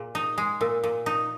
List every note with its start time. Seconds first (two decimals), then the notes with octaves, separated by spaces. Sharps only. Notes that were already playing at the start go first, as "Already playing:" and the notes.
Already playing: A#2 G#4
0.15 D#4
0.38 G#3
0.61 A#2 A#4
0.84 A#2
1.06 D#4